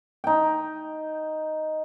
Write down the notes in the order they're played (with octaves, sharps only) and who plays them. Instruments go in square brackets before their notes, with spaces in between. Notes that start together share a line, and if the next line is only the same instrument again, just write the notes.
[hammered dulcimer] D#4 G5